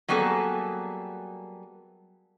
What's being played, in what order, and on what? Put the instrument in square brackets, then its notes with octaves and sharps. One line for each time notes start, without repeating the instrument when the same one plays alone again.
[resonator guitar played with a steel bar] F#3 G3 A#3 B3 G#4 A4